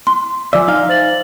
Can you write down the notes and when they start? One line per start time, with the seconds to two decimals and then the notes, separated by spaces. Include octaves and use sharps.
0.07 C6
0.53 F3 D5 E5 G#5 D6
0.68 D#4 F5
0.89 C5 A6 F#7